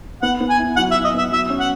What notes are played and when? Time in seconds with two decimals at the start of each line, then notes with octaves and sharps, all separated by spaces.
0.22 B3 F#5
0.41 B3
0.50 G#5
0.59 E4
0.76 F#3 F#5
0.91 E5
0.95 F#3
1.05 D#5
1.14 B3 E5
1.32 F#3 E5
1.50 C#4
1.60 F#5